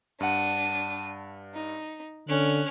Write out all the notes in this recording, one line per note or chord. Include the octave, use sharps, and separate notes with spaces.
G2 D4 F#5 D#7
D#4
D3 C#4 F6 F#6